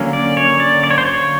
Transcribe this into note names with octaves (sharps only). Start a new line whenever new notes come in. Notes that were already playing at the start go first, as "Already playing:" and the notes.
Already playing: D3 F#3 A#3 C#4
D5
C#5
D5
D5
C#5
C5
C#5